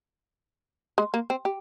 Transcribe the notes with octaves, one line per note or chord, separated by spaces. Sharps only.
G#3
A#3
C4
G4